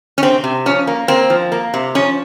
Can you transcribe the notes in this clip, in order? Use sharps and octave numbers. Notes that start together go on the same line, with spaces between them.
C#4
C3 C4
C3
F3 C#4
A#3
A#3 C4
F3
A#3
C3
F3 C#4